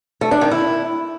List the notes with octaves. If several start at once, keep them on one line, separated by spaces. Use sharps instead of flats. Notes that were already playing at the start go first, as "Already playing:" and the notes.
A3
D4
D#3
E4